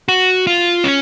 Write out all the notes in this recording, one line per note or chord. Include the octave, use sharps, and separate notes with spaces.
F#4
F4
C#4